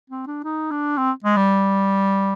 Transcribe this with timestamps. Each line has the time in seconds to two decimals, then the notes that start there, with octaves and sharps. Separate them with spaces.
0.10 C4
0.27 D4
0.44 D#4
0.71 D4
0.98 C4
1.24 G#3
1.37 G3